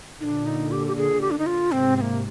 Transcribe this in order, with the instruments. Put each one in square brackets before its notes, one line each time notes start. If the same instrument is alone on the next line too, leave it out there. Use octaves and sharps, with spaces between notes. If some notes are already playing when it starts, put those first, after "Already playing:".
[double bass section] A#2 D3 [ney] D4 D#4
[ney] D#4
G4
G4
G#4
G4
D4
D#4
F4
[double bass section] G#2 C3 [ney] C4
[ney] C4
A#3